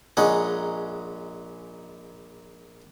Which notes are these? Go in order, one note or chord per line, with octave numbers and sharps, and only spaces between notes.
A#1 G#3 C#4 D#4 F#5